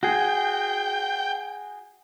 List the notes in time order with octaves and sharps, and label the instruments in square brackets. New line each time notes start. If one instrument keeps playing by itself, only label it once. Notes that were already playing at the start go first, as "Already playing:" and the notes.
[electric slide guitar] F#4 G#4 [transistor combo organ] G5